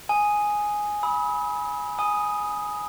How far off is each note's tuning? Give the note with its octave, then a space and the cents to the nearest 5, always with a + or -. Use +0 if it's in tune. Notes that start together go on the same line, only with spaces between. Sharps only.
G#5 +0 D#6 +0
B5 -15 D#6 +45
G#5 +0 D#6 +0